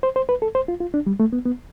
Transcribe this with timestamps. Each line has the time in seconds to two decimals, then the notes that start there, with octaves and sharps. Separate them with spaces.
0.03 C5
0.16 C5
0.29 B4
0.42 A4
0.55 C5
0.68 F4
0.80 F4
0.94 D4
1.07 G3
1.20 A3
1.33 B3
1.46 B3